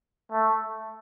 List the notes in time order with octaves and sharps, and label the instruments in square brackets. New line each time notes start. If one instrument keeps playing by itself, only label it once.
[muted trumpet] A3